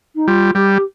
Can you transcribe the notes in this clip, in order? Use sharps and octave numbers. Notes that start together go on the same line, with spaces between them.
D#4
G3 F4
G3 G4